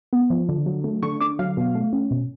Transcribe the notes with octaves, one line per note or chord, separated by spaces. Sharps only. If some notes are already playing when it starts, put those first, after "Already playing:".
B3
F3
D3
F#3
A3
D3 C#6
D3 D6
F#3 F5
B2
A3
C#4
B2